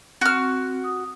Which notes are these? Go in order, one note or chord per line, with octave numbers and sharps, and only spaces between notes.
C4 F#4 F6
D#6